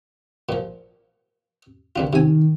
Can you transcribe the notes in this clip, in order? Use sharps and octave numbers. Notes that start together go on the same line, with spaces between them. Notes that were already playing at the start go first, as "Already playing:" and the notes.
A#2 F3
C2 D3 D4 F4
C3 D#3 G#5